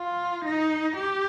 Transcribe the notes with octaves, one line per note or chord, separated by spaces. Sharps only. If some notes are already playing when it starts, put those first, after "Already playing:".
Already playing: F4
D#4
G4